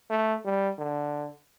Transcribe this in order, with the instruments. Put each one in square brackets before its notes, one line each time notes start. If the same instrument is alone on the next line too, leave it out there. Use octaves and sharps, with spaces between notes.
[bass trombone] A3
G3
D3